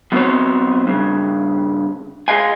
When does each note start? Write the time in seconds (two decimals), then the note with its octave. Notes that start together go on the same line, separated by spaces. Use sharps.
0.12 F#3 B3 C4 F#4 C5 C#5
0.87 G2 C#3
2.28 G#4 D#5 F5 G#5